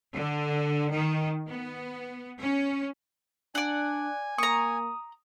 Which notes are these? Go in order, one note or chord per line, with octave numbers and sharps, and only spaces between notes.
D3
D#3
B3
C#4
D4 D5 F#5 G#5
A#3 A#5 C#6 D#6